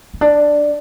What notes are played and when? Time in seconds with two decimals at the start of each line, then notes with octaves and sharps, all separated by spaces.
0.14 C#4
0.21 D4